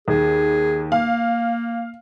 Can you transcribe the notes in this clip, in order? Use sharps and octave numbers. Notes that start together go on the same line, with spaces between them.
D#2 G#4
A#3 F5